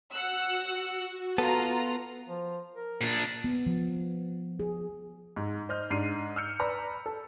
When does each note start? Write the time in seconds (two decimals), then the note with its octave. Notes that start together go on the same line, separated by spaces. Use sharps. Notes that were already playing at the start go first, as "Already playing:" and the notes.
0.14 F#4 F#5 E6 F#6
1.38 B3 F4 A4 A#5
2.29 F3
2.75 A#4
3.01 A#2 D4
3.44 B3
3.67 F3
4.60 G#4
5.36 G#2
5.69 C5 D#5 F6 G6
5.90 G#2 D4 C7 D#7
6.36 E6 F6 G6 C#7
6.59 B4 D5 A#5 B5
7.06 A4